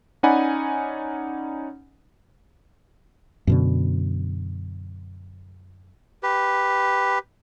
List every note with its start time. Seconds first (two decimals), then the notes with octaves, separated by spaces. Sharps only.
0.23 C#4 D#4 D5 F#5 G#5 B5
3.47 F#2 B2 D3
6.23 G4 B4